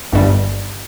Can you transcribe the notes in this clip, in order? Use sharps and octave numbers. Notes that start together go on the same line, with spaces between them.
G1 G2 G3